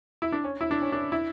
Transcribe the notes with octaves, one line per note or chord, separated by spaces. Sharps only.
E4
D4
C#4
E4
D4
C#4
D4
E4